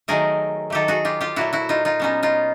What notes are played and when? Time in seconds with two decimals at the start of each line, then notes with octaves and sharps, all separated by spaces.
0.08 D#3 F#3 A3 G#4 A#4
0.70 D#3 F#3 A3 G4 A4
0.88 F#4 G#4
1.05 F4 G4
1.21 F4 G4
1.36 A#2 F#3 A3 E4 F#4
1.53 E4 F#4
1.69 D#4 F4
1.85 D#4 F4
2.00 A#2 F#3 B3 C#4 D#4
2.23 D#4 F4